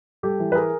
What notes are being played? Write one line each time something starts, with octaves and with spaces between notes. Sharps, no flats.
G3 G4 A4
E3
B4
G#4 A#4